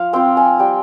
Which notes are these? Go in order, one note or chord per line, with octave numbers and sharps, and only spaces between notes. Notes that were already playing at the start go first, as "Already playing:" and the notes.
Already playing: F3 F5
C4 F4 G5
G#5
G3 G5